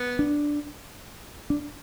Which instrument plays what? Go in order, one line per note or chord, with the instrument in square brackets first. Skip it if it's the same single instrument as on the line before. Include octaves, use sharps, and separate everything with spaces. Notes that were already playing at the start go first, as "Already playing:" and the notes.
Already playing: [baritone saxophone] B3
[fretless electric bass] D4
D4